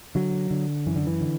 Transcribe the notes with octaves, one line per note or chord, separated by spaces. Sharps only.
D3 F#3
D3
F#2 E3
D3
E3
D3